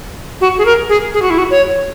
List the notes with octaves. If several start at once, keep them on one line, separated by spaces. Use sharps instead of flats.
F#4
G#4
A#4
G#4
G#4
F#4
E4
F#4
C#5